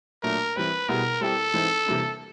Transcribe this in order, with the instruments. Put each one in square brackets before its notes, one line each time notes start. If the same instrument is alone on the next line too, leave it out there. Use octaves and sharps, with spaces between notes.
[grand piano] A#2 F#3 A3 D4 [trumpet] A#4
[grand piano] E3 G3 C4 [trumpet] B4
[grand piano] B2 G3 B3 E4 G#4 [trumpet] A#4
[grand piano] G3 C4 E4 G4 [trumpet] A4
[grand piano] E3 G#3 C4 D#4
C3 E3 G3 A#3 D4